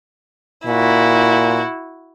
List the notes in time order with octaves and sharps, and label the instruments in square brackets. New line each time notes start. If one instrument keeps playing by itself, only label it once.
[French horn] A#2 [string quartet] E4 F#4